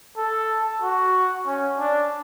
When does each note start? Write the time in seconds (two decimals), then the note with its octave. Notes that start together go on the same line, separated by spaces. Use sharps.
0.18 A4
0.82 F#4
1.47 C#4
1.79 D4